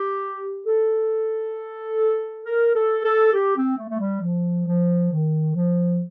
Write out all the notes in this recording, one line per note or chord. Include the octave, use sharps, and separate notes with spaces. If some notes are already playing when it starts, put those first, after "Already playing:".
Already playing: G4
A4
A#4
A4
A4
G4
C4
A3
A3
G3
F3
F3
D#3
F3